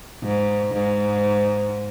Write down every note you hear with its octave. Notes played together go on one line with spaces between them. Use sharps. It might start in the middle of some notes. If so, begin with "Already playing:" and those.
G#2
G#2